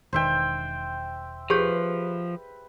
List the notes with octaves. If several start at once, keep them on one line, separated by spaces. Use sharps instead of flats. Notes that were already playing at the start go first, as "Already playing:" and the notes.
E1 D#3 C5 E5 G5
F3 G4 G#4 B4 C#5